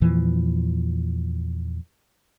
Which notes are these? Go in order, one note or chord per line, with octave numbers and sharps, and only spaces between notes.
E2 A#2 E3 F3